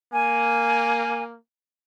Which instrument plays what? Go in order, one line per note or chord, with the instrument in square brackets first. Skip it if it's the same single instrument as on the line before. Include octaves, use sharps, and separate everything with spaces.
[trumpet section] A#3 [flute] G#5